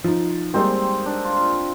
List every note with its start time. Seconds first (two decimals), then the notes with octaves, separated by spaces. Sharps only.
0.04 F3 D#4
0.54 G3 G#3 A#3 C4 D#4
1.06 D4
1.25 F4